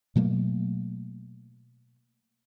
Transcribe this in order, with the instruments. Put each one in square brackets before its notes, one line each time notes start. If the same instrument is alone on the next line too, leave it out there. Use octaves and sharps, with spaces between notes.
[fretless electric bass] B2 F#3 A3 A#3